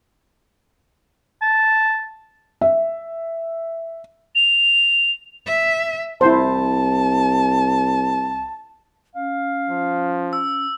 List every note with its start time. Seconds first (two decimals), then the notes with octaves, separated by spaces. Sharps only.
1.42 A5
2.61 E5
4.35 F7
5.47 E5
6.21 C2 E4 C5 A5
9.15 C#4 F5
9.69 F3
10.33 E6